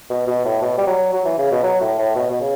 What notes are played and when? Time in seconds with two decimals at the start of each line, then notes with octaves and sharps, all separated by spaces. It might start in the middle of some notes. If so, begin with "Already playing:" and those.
0.10 B2
0.27 B2
0.45 A2
0.61 B2
0.78 G3
0.87 F#3
1.13 F#3
1.25 E3
1.38 C#3
1.51 B2
1.64 F#3
1.81 A2
1.99 A2
2.15 B2
2.30 B2
2.41 C#3